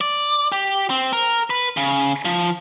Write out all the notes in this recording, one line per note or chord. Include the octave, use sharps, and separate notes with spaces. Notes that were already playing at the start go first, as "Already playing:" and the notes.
D5
G4
C4
A#4
B4
C#3
F3